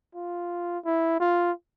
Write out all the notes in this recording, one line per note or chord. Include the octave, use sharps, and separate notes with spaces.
F4
E4
F4